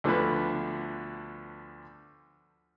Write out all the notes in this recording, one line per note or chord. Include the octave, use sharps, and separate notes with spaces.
D2 D3 F3 B3 B4